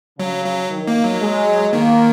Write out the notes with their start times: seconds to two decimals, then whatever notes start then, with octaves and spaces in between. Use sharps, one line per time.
0.19 C#3 F#3
0.45 F#3
0.70 D#3
0.88 A#3
1.04 F#3
1.21 G#3
1.73 D#3 A#3